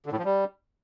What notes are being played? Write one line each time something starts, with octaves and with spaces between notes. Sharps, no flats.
D3
A2
F3
G3